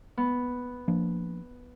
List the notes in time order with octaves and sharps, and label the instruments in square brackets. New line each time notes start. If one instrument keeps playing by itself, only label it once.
[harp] B3
[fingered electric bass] F3 A#3 D4